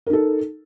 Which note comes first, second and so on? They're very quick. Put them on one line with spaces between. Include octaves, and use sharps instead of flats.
A#4 D#4 A4